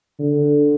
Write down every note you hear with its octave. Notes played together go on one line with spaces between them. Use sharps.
D3